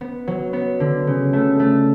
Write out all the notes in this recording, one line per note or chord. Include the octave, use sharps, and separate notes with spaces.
B3
F#3
B3
D3
C#3
A3
A3